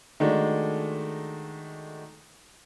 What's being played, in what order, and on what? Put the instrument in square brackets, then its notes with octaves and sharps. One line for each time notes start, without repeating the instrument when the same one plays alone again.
[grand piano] D#3 G#3 A3 D4 F#4